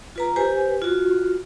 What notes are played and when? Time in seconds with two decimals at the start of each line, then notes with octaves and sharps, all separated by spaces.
0.16 F4 B4 A#5
0.36 G4 B4 C5 G#5
0.82 F4 F#4